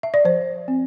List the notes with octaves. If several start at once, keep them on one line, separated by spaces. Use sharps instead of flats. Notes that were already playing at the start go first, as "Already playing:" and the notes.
E5
D5
F3 C5
C4